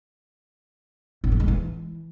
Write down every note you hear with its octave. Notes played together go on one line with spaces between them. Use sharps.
A2
F3
G#3
E3